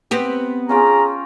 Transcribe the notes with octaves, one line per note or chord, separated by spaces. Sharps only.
B3 C4 G4
C#4 F4 G#4 G5 A#5